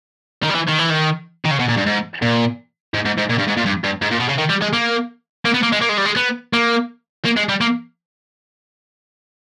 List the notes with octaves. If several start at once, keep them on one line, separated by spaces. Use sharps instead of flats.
D#3
G3
E3
D#3
E3
D#3
D#3
C#3
B2
A#2
G2
G#2
A#2
G#2
G#2
G#2
A#2
G2
G#2
A#2
G2
G2
G#2
A#2
B2
C#3
D#3
G3
G#3
A#3
A#3
B3
A#3
G#3
A#3
G#3
G3
G#3
B3
A#3
A#3
G#3
G3
A#3